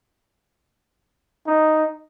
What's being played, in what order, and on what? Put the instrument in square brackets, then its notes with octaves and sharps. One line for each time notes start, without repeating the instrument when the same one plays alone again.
[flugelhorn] D#4